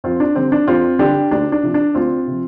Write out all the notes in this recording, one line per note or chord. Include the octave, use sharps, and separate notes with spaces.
F2 C4 F4
D4
D3 G3 C4
D4
F2 C4 F4
D3 G3 D4 G4
D2 D4
D4
C3 F3
D4
D2 C4 F4
C3 F3